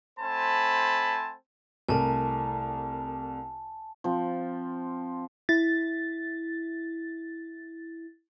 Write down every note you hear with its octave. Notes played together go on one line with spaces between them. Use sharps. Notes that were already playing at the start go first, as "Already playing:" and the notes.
A3 C4 C5 G#5 A5 B5
C2 A3 A#4 G#5 A5
F3 C4
E4 A6